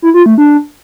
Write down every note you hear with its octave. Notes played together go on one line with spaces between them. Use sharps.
E4
F4
A3
D4